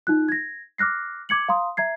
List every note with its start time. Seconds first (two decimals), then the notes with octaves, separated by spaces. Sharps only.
0.07 D#4 F4 F#6
0.28 G#6 A#6
0.78 D6 F6 F#6 A#6 C7
1.29 D6 G#6 C#7 F#7
1.48 F5 A#5 C6 D#6
1.77 E5 A#5 G#6 C7